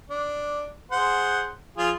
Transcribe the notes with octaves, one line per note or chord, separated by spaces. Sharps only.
D4
G#4 C5 F#5
F3 F4 G#4